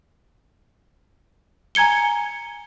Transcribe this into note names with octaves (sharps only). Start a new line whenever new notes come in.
G#5 A#5 G#6 C#7 G7